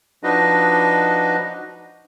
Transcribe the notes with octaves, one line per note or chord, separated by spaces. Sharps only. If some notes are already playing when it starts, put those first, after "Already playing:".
F3 D4 D#4 F#4 B4 D#5